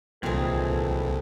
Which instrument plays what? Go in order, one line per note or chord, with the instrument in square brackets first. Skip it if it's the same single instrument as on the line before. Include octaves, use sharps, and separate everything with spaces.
[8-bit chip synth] C2 [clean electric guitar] A#2 D#3 E3 [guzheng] C4 G#4 [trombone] A4